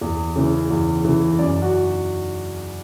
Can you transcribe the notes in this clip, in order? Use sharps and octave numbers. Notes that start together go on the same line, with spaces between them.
E2
C#3 E3
E2
C#3 E3
F#2 D5
F#4